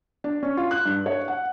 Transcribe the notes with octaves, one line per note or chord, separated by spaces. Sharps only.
D4
C#4
F4
F#6
G2
C#5
F#5